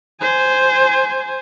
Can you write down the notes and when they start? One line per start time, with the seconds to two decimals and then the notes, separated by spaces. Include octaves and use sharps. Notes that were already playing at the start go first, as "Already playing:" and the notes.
0.21 C5 G#5